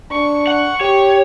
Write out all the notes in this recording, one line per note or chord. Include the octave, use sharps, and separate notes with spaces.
D4 C#6
F#5
G4 C#5